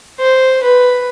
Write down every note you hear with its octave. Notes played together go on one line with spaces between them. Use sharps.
C5
B4